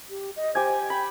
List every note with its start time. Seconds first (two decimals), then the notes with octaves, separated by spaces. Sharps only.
0.10 G4
0.36 D#5
0.55 G4 C5 G#5
0.90 G5 B5